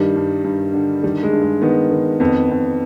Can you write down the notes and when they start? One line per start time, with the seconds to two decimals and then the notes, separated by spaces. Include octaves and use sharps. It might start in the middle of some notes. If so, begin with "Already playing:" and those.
Already playing: G2 D#3 G3
0.16 G2
0.44 G2
0.73 D3
1.03 D#3 G3
1.23 G#3
1.33 G2
1.42 G#3
1.62 D#3 B3
1.91 D#3
2.20 F2 B3
2.50 F2